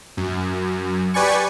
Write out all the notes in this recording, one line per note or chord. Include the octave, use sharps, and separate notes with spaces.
F#2
G4 B4 D5 G#5 C#6